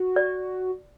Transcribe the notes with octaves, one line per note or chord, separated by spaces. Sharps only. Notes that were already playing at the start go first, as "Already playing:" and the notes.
Already playing: F#4
D5